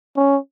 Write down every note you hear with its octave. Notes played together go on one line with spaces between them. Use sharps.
C#4